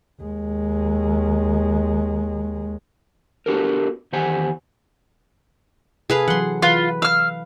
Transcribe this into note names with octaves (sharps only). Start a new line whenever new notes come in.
D#2 G#3
B3 D4 F#4 G4 A4 A#4
E2 D#3 G4 C5 F#5 G#5
C3 G#4 A4 B4 F5
E3 F#3 F#5 C6
E3 F4 B4
F5 E6 F6